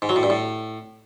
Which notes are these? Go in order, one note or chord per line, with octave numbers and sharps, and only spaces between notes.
G#2
F#3
A2
G2
A2